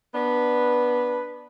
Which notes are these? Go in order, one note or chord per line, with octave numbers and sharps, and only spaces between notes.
B3 D4 B4